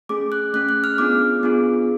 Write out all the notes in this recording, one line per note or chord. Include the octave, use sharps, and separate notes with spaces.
A3 C#4 G#4 D6
F#6
A3 C#4 G#4 F#6
F#6
F6
B3 D4 F4 G#4 D6
B3 D4 F4 G#4